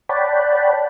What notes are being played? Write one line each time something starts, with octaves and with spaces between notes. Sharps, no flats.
C#5 D5 F#5 G5 A5 B5